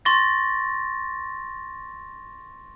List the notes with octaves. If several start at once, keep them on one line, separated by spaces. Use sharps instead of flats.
C6 C#6 A6 A#6